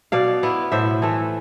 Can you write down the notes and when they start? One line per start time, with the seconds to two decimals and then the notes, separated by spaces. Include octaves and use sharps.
0.12 B2 D5 F5
0.43 B3 E4
0.72 A2 C5 E5
1.02 E3 A3